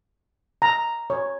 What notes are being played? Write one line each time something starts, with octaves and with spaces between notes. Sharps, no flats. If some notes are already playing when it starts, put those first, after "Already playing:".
A#5
C#5